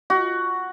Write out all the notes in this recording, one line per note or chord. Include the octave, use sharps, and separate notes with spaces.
F#4